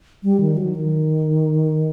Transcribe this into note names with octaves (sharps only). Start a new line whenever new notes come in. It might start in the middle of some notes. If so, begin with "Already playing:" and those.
G3
D#3
F#3
D#3